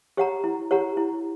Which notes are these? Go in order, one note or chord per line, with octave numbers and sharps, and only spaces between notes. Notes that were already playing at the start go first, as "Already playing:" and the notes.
G4 C#5 F#5 A#5
E4
G4 C#5 F#5 A#5
E4